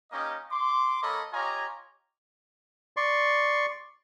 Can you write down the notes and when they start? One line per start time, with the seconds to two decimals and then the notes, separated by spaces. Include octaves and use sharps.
0.12 A#3 C#4 D#4 G4 D#5
0.51 C6 D6
1.02 A#3 A4 C#5 D#5 B5
1.33 F4 G4 C#5 D#5 G#5 A#5
2.97 D5 C6 C#6